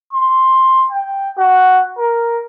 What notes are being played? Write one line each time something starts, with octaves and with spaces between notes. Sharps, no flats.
C6
G5
F#4
A#4